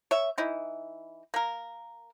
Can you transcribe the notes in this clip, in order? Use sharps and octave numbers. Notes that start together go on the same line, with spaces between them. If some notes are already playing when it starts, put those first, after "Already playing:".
C#5 E5
E3 D#4 E4
A#3 A#4